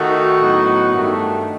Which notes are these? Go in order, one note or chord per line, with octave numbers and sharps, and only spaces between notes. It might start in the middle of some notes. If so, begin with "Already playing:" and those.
Already playing: D#3 A3 D#4 F#4
A2 F#3 B3 D#4
G2 D#3 A3